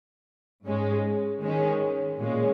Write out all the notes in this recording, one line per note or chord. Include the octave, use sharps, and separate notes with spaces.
G#2 G#3 C#4
D#3 G#3 C#4
A#2 G#3 C#4